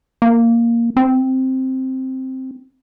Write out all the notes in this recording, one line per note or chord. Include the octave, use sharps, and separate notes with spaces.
A#3
C4